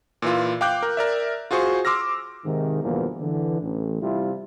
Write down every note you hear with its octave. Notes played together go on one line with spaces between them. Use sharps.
A#2 E3 F4
F5 G5 D6 F#6 G6
A#4
A#4 D5 E5
F4 F#4 G#4 C5 C#6
C6 D6 E6 F6 A#6
G#2 C3 D#3
E2 G2 B2 F3 A#3
D3 E3
A1
C3 G3 E4 F4